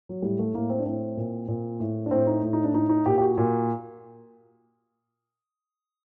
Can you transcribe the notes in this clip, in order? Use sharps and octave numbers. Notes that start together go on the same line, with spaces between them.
F#3
A2 G3
A3
A2 A#3
C4
D4
A2 C4
A#2
A#2
A2
D4
A2 C4
D#4
A2
D#4
D4
A2 D#4
D#4
A#2 G4
G4
F#4
A#2